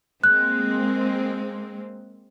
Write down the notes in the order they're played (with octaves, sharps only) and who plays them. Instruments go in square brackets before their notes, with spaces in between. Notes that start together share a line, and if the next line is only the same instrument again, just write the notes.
[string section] G#3 A#3 C4 [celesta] F#6